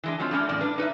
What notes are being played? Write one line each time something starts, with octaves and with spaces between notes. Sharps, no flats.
E3 G#3 D4
F#3 G#3 C4 F4
G3 A3 C#4 D4
E2 A2 G3 D5
D4 B4
D#4 B4 C5 E5